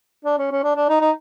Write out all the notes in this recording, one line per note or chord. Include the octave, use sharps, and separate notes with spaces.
D4
C#4
C#4
D4
D4
D#4
D#4